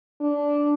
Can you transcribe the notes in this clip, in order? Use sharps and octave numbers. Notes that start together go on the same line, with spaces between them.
D4